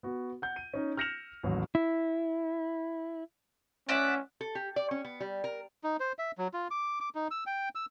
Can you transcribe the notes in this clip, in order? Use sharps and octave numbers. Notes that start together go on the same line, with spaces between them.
B3 F#4
F#5 G6
D#7
C#4 D#4
F6 G6 A#6 C#7 E7 F7
A1 D#2 F#3
E4
C#4 D5 E5 F#5
A4
G4
D5
C#4
B3
G3
A#4
D#4
C5
E5
F#3
F4
D6
D6
D#4
E6
G5
E6